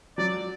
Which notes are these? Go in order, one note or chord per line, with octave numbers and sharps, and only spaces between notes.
F#3 D5